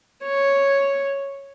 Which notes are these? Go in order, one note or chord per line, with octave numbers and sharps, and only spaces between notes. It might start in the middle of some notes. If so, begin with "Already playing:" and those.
C#5